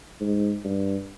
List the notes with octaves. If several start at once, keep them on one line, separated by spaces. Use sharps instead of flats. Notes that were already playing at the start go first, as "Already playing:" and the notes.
G#2
G2